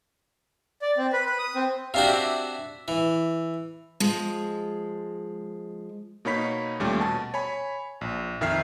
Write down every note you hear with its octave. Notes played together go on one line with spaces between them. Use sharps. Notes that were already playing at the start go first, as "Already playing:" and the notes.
D5
C4
B4
B4
D#6
C4
C3 D4 F#4 G4 F5
E5 D6
E3
F3 G#3
B2 A#3 D#4 C#5 B5 B6
D#2 A#2 G3 A3 C#4
B2 A5
C#5 G#5 B5
A#1
F2 D#3 E5 F6 C7